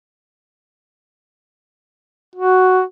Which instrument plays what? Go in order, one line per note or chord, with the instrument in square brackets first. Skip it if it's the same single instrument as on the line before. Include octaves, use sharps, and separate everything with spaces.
[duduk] F#4